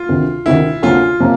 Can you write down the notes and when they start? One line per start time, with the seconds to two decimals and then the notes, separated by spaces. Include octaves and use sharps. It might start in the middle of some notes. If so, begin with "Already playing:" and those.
Already playing: F4
0.09 D2 C3 D#3
0.46 D2 C3 D#3 E4
0.82 D2 C3 F3 A#3 C#4 F4
1.20 C3 F3 A#3 C#4